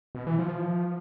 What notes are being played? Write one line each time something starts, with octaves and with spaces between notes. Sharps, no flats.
B2
E3
F3